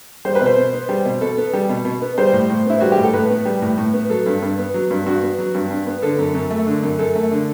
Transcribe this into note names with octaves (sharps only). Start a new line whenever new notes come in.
G3 C5
B4
B2 C5
B2
B3
G3
B2
B2 A4
B3
G3
B2
B2
B3
G3 C5
A2
A2
B3 E4
G3 F#4
G4
A2
A4
A2 B4
B3
G3
A2
A2
B3
F#3 A4
G2
G2
B3
F#3
G2
G2 F#4
B3
F#3
G2
G2
B3
D3 A4
F#2
F#2
A3
D3
F#2
F#2 A4
A3
D3